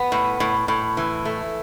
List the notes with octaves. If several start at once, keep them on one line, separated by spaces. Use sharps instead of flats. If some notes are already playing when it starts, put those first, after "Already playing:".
Already playing: B3
A2
A2
A2
E3
A3